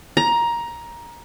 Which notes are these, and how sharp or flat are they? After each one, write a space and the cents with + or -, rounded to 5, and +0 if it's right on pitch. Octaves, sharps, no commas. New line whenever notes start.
A#5 +15